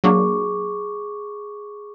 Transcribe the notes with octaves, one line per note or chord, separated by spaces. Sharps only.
F#3 A#3 D4 G#4 C#6 D6